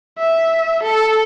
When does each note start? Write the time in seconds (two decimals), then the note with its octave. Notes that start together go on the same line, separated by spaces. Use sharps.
0.19 E5
0.83 A4